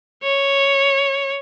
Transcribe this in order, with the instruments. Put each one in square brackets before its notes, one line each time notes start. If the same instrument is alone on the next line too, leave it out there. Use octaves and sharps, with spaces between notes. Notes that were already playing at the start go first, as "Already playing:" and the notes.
[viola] C#5